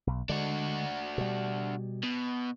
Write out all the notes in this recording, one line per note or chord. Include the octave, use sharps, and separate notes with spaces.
B1
D3 G#3 D4 F#4
B2 G3
B2